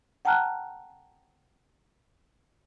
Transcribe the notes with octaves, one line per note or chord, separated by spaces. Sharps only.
F#5 G5 A5 A#5 F6 F#6